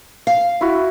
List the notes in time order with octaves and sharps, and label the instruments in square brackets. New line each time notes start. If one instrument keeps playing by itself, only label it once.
[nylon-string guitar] F5
[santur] E4 F#4